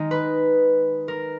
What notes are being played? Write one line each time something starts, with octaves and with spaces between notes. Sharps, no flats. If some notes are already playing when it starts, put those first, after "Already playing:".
Already playing: D#3 G#3 D#4
B4
A#4